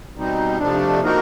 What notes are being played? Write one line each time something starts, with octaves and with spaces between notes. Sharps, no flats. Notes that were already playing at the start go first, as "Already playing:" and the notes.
B2 G3 C4 D#4
F2 C3 F3 A3 D4
F3 A#3 D#4 F#4 A#4